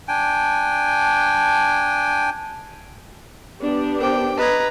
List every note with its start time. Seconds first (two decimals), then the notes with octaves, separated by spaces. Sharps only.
0.08 D4 G5 G#5
3.60 B3 D4 G4
4.01 A#4 C5 G5 D6
4.38 B4 D#5 A#5 D#6 G#6